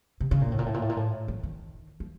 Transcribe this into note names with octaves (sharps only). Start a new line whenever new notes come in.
C3
C#3
A#2
A2
A#2
A2
A#2
A2
A#2
A2
F3
D#3
F3